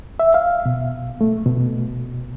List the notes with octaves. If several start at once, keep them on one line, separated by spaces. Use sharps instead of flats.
E5
F5
B2
A3
B2